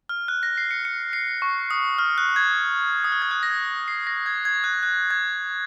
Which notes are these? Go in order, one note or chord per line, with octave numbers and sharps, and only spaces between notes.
F6
F#6
A#6
C7
C#7
C#7
C7
C#6
D#6
F6
F#6
G#6
D#6
F6
G#6
F#6
A#6
G#6
C7
A#6
G#6
G#6
F#6
F#6
G#6